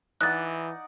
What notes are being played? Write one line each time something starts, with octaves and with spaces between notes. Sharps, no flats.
E3 D#4 D5 F#5 F#6 A6